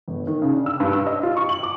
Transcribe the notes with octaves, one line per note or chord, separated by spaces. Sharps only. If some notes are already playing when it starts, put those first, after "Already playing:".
G1
D#3
C#3
D4
E6
G2
E6
D#5
F4
C#6
F#7
D6